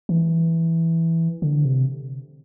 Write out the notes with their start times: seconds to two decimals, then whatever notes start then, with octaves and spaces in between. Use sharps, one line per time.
0.09 E3
1.42 D3
1.65 C3